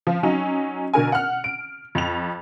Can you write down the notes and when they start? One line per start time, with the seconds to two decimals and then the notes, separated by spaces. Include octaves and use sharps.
0.07 F3
0.23 F#3 C#4 D#4
0.94 B2 D3 A#4 G#5
1.12 F#5 F6
1.44 D7
1.95 F2 F7